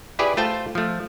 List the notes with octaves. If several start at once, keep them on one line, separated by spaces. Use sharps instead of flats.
E4 G4 G#4 B4 D5
A3 F4 C5 G5 A5
F3 A3